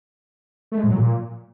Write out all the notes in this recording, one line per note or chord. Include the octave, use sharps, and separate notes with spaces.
A3
G#3
A2
F#3
A#2